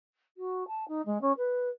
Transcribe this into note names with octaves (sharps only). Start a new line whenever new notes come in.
F#4
A5
D#4
G#3
C#4
B4